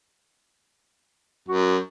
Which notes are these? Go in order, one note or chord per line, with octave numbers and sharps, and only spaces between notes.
F#2 F#4